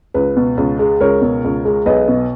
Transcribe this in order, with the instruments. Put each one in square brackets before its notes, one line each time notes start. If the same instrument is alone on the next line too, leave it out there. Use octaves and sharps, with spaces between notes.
[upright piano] C#2 B4
B2
C#2
G#3
C#2 A#4 C#5
B2
C#2
G#3
B1 B4 D#5
B2